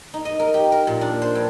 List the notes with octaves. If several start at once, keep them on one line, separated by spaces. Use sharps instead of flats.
D#4
D#5
A#4
G4
A#4
A#2
D4
C5
G2